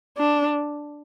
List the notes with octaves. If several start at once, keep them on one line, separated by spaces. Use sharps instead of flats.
D4